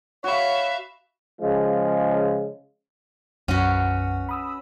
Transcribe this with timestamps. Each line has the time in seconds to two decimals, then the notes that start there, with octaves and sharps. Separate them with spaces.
0.24 F#4 C#5 E5 F5 B5
1.40 C#3 F3 G#3
3.48 B1 F#2 C#4 F#4 B4 F#5
4.29 B5 D#6 E6